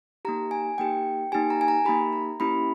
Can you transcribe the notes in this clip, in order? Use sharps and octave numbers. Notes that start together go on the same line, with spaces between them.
A#3 D#4 G4 A#5
G#5
A#3 D#4 G4 G5
A#3 D#4 G4 G#5
A#5
G#5
A#5
A#3 D#4 G4 B5
A#5
A#3 C#4 E4 G4 B5